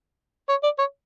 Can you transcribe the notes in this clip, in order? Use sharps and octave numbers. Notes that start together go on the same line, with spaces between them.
C#5
D5
C#5